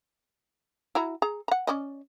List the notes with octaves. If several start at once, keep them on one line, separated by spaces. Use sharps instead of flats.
E4 F#4 A#5
G#4 A#5
F#5 A#5
C#4 D5 D#5